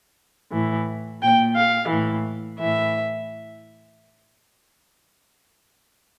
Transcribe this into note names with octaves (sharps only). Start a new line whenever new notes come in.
A2 E3
A#2 G5
F5
A2 E3
A2 E3 E5